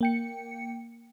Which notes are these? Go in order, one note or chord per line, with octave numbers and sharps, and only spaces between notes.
A#3 G5 C#7